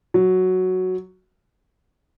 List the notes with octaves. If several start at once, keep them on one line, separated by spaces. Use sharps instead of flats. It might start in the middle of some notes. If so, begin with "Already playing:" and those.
F#3